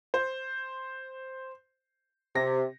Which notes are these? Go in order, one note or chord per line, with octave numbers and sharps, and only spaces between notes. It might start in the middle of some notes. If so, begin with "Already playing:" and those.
C5
C3 A#6